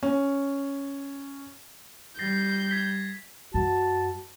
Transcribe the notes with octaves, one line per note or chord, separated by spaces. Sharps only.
C#4
G3 G6 A6 A#6 C7
G#6 B6
F#2 F#4 A5